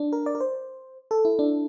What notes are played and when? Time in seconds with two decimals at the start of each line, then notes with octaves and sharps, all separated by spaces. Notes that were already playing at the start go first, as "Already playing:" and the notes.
Already playing: D4
0.13 A#4
0.26 D5
0.35 A#4
0.40 C5
1.11 A4
1.25 E4
1.39 D4